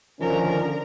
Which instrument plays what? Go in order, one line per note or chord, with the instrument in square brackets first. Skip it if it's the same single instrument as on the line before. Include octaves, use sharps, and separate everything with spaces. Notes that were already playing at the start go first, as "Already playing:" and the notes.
[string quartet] D3 A#4 [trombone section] D#3 F3 C#4